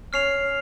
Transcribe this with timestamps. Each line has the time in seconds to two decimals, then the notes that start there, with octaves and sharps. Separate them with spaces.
0.13 C#4 F6 C7 F7